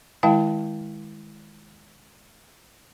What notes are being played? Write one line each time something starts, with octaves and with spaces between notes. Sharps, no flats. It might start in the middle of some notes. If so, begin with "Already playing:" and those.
D#3 G#3 E4 F5 G5 A5